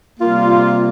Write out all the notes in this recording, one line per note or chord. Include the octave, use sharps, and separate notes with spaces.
C3 G3 A#3 F4